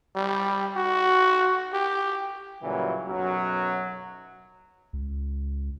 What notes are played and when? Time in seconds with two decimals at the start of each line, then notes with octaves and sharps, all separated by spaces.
0.16 G3
0.76 F#4
1.73 G4
2.62 A#2 C#3 E3 F#3 G3
3.07 B1 F#2 F#3
4.93 C#2